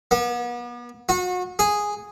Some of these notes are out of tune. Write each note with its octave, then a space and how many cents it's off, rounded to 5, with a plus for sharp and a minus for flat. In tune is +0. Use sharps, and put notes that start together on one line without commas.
B3 -40
F#4 -35
G#4 -5